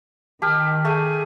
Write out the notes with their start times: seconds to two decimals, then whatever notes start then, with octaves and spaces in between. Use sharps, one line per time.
0.42 D#3 G4 A5 F6
0.85 A3 G#4